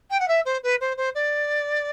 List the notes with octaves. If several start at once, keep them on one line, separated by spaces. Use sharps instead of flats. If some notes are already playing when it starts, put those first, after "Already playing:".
G5
F#5
E5
C5
B4
C5
C5
D5